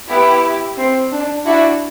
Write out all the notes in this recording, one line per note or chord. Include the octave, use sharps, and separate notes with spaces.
B3 E4 G4
C4
D4
D4 E4 F#4